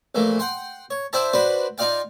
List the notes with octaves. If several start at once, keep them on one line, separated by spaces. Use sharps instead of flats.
A#1 E3 A3 A#3
F#5 G5 C6
C#5
E4 C5 D5 E5 G5 A5
D4 F#4 B4 C5 D5
D#4 F4 D5 F5 G5